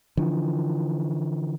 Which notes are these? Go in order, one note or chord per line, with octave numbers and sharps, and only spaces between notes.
D3 E3 F3